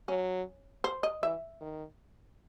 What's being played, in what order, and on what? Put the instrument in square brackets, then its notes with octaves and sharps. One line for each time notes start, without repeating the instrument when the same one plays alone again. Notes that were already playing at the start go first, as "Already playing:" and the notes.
[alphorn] F#3 [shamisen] C#4
[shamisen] C5
D#5
[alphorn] E3 [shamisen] E5
[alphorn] D#3